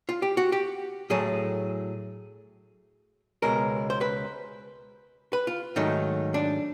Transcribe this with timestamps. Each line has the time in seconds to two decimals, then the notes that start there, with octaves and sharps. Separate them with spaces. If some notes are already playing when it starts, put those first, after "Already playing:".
0.09 F4
0.22 G4
0.37 F#4
0.52 G4
1.10 A2 F#3 A3 G#4
3.42 C#2 B2 G#3 A#4
3.90 C5
4.01 B4
5.33 B4
5.47 F4
5.76 G#2 D#3 F#3 A3 D#4
6.34 D4